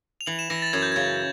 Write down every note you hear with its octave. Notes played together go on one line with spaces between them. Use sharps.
F7
E3 F#7
E7
E3 A#6
A6
F#2 G#6
G6
C#3 G#6